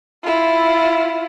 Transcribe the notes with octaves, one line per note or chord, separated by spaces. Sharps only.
E4 F4